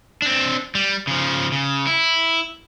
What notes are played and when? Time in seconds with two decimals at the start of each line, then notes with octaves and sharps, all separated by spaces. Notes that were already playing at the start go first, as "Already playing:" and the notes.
0.22 C4 D4
0.75 G3
1.07 C#3 F3
1.52 C#3
1.87 E4